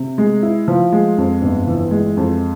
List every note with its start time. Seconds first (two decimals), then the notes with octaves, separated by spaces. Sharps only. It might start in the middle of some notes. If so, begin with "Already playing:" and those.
Already playing: C3
0.18 G#3
0.42 E4
0.68 F3
0.92 G#3
1.18 F2
1.42 G1
1.67 E3
1.91 G#3
2.17 F2